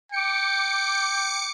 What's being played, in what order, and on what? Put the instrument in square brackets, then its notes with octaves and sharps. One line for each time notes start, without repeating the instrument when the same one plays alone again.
[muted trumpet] G5 [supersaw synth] D6 C#7